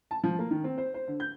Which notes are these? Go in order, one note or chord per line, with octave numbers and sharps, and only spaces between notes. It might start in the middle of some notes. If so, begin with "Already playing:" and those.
A5
F3
A#3
D#3
C4
C5
C5
D3
G6